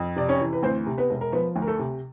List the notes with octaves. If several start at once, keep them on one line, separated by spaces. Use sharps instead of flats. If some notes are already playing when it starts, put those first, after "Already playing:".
Already playing: F2
C3 D5
C#4 C#5
E3
B4
D2 C4 C5
C3
B3 B4
E1
A#4
F3 B3 B4
D2
A#4
A3 A4
C3